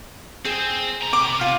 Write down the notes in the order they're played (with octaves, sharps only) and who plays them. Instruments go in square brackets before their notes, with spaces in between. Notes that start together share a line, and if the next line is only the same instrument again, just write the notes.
[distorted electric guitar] C4 [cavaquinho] G#4
[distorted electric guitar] C3 A#5
[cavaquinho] D6
F4